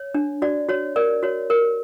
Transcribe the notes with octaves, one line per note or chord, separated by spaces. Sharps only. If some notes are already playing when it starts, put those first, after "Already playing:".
Already playing: C#5
D4
F#4 D5
F#4 C#5
A#4 D5
F#4 C#5
A#4